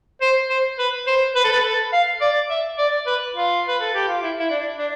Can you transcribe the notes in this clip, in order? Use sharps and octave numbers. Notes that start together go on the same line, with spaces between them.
C5
C5
B4
C5
B4
A4
B4
A4
F5
D5
E5
D5
B4
F4
B4
A4
G4
F4
E4
E4
D4
D4